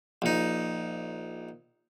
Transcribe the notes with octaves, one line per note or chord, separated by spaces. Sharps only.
A#1 D#4